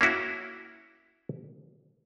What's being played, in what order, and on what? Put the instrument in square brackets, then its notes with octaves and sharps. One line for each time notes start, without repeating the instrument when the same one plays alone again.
[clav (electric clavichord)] A#3 C#4 E4 F#4